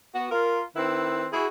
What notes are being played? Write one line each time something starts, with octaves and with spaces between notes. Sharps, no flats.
B3 F#4
F4 A#4
D#3 C4 E4 B4
E4 F#4 G#4